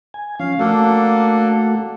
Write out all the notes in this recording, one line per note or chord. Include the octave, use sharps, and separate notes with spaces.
G#5
F3 C#4 F5
A3 A#3 D4 F#4 A4